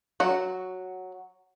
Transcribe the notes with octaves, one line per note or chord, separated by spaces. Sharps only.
F#3 F#4